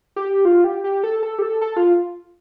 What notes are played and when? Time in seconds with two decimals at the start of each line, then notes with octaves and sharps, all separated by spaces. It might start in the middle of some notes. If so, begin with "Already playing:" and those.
0.16 G4
0.45 F4
0.64 G4
0.84 G4
1.04 A4
1.23 A4
1.39 G4
1.42 A4
1.61 A4
1.77 F4